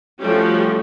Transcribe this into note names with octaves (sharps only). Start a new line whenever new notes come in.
F3 G3 A3 C#4 F#4 G4